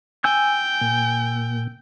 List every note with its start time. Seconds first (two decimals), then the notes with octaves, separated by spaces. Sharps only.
0.24 G5 G#5 E6 G6
0.81 A#2